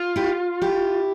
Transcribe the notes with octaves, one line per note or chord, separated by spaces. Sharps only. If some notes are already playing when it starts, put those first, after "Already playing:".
Already playing: F4
E4 G4
E4 G4